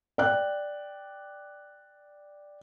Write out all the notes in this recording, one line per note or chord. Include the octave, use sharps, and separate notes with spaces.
D5 G5 F#6